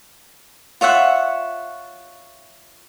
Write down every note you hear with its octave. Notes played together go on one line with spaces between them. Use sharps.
F4 C#5 E5 F#5